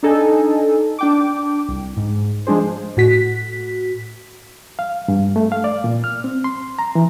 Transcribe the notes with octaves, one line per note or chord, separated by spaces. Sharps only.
D4 D#4 A4 D#5 G#5
D4 G5 D6
C2
G#2
F3 G#3 D4 G#4 C5
A2 F#4 B6
F5
G2
A3
F5
D5
A#2
F6
C4
C6
A#5
E3